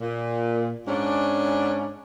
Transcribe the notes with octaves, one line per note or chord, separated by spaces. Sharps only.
A#2
G#2 C#4 D4